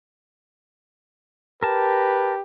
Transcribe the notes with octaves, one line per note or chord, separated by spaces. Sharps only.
G4 A#4 B4 A5